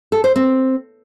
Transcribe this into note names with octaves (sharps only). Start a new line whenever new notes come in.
A4
C5
C4